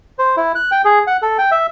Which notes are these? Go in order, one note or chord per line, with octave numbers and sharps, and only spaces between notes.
C5
E4
F#6
G5
G#4
F#5
A4
G5
E5